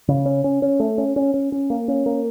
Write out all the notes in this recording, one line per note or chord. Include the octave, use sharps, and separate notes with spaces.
C#3
C#4
C#4
C#4
A3
C#4
C#4
C#4
C#4
A#3
C#4
A#3